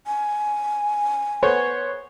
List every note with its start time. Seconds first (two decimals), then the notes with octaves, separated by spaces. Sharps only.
0.07 G#5
1.42 B3 C5 C#5